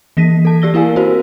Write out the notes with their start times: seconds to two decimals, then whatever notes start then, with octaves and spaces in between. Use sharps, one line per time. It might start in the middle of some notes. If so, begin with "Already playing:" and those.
0.17 E3 A#3 A#6 B6 D#7
0.45 A4 A5
0.62 G4 D5 E6 A#6 G7
0.74 A#3 E4 A#4 F5 G#5 E6
0.96 C4 F#4 A#4 C5